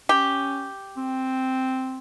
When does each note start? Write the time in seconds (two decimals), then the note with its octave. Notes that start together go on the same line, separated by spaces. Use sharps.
0.09 C#4 G4
0.97 C4